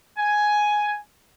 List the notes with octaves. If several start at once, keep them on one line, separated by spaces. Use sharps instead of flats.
G#5